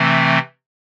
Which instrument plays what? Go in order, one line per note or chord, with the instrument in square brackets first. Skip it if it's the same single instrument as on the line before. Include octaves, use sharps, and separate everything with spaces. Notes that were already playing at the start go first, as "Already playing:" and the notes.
Already playing: [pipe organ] C3 E3 A3 C4